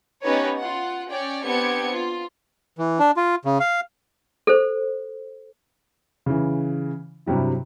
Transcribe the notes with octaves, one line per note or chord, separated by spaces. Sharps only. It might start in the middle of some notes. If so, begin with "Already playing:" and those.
B3 C#4 D#4 G4 B4 C#5
F4 F#5
C#4 C#5 D5 G5
B3 C4 D4 G4 G#6 C#7
F4
E3
D4
F4
C#3
F5
A4 C5
C#3 E3
G2 C3 F#3 G3 E4